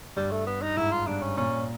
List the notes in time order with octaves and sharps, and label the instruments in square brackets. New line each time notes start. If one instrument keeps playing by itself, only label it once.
[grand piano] G2 [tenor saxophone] G3
[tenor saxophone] A3
B3
D#4
[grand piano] G#2 [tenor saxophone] E4
[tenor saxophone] F4
[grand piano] G2 [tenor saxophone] D4
[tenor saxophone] C#4
[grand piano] A#2 [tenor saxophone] C#4